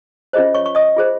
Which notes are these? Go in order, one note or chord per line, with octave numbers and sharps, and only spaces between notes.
C#4 F4 G#4 C5 D#5
C#5 C#6
C#6
D#5 D#6
F4 G#4 C5